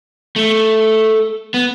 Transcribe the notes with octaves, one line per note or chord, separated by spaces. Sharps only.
A3
B3